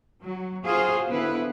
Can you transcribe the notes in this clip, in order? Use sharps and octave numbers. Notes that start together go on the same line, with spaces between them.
F#3
F4 F#4 G#4 C5 F5
D3 B3 E4 B4